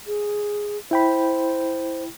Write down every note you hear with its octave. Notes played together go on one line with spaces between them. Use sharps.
G#4
E4 C5 G5 B5